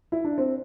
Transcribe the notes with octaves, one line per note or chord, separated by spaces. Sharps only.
E4
D4
C4